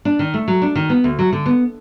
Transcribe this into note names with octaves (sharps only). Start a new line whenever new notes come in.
D4
D#3
A3
F#3
D4
D#3
B3
D2
F#3
D3
B3